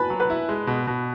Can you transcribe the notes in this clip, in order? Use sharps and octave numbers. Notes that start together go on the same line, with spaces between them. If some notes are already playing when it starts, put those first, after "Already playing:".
Already playing: B4 G#5 A5 B5
F#3
B4 B5
E4
G#3
B2
B2